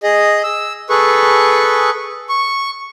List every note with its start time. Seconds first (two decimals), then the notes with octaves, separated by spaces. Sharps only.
0.03 G#4 D#5
0.43 E6
0.90 G#4 A4 B4 C#6
2.29 C#6